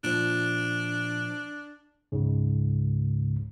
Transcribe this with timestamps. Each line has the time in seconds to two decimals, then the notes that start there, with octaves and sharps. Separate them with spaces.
0.04 A#2 F3 D4
2.12 C#2 G#2 C#3